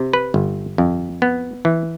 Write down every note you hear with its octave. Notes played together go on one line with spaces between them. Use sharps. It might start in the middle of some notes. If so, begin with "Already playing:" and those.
Already playing: C3
B4
G1
F2
B3
E3